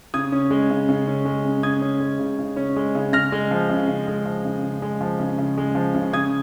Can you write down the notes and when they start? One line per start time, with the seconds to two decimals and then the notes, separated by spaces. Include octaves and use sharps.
0.14 C#3 D#6 G#6
0.32 C#4
0.51 G#3
0.70 C#3
0.89 C#3
1.08 C#4
1.25 G#3
1.44 C#3
1.63 C#3 D#6 G#6
1.82 C#4
2.00 G#3
2.19 C#3
2.39 C#3
2.57 C#4
2.76 G#3
2.95 C#3
3.13 C#3 F6 A#6
3.32 G#3
3.51 F3
3.70 C#3
3.88 C#3
4.07 G#3
4.25 F3
4.45 C#3
4.63 C#3
4.82 G#3
5.01 F3
5.19 C#3
5.38 C#3
5.57 G#3
5.75 F3
5.95 C#3
6.13 C#3 D#6 G#6